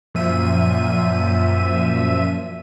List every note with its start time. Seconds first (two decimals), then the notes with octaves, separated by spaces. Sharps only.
0.15 F#2 A#2 F3 E5 D#7